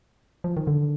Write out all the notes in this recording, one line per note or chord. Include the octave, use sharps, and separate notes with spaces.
F3
D#3
D3